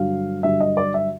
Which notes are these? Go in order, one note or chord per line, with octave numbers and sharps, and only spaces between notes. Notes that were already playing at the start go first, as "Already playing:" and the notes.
Already playing: G2 D3 F#3 F5
G2 D3 F#3 E5
D#5
D5
E5